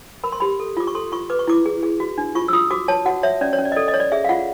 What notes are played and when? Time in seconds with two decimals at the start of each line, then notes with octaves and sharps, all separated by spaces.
0.24 A#4 B5
0.32 C6
0.40 G4 B5
0.60 A4
0.77 F4 D6
0.87 C#6
0.95 A4 C6
1.12 F4 C#6
1.30 B4 D6
1.39 C#6
1.47 E4 D6
1.66 G#4
1.83 G#4
2.00 F#4
2.18 D4
2.35 F4 C#6
2.48 E6
2.53 F4 D#6
2.71 F#4 D6
2.88 C#5 A5
3.05 F#4 F#5
3.23 C#5 E5
3.41 C#4 D5
3.53 C#5
3.59 C#4
3.65 D5
3.72 D#5
3.76 A4 D5
3.88 D#5
3.94 C#5
4.00 D5
4.12 G#4 E5
4.24 F5
4.29 F4 F#5